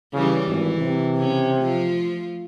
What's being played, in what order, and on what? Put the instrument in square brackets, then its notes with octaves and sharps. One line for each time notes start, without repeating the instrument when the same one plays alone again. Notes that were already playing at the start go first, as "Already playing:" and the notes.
[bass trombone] C#3 [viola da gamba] E3 G3
[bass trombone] G#1 [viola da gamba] E3
[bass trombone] C3
[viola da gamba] C#3 C#4
F3 A3 F4